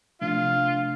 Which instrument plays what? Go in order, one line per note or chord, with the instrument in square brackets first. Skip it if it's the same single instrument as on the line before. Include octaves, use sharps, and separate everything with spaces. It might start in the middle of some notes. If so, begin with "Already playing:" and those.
[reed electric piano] C3 F3 A3 D4 [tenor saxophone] F4